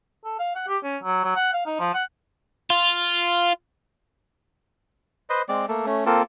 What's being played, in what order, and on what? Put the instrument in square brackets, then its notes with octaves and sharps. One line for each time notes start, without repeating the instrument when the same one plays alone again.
[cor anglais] A4
F5
F#5
G4
C#4
F#3
F#3
F#5
F5
D#4
F3
F#5
[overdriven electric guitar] F4
[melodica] B4 C5 D#5
G#3 C4 D5
A3 A#3 A4
A3 C#4
A#3 C4 F4 A4